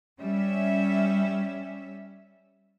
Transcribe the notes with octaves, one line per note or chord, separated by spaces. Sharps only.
G3 C#4 E5